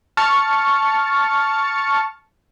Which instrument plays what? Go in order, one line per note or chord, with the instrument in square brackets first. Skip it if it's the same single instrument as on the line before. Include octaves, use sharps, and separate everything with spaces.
[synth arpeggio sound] A5 C#6 F6 A6 C#7